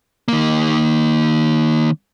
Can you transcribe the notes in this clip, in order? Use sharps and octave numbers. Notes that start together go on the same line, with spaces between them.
D#3 A#3